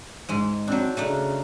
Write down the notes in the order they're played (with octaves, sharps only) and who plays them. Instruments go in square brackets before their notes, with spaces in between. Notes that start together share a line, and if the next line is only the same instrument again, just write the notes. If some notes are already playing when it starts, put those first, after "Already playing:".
[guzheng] G#2 G#3
[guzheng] F#3 D4 [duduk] C4
[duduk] C#3 [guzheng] A3 D4 D#4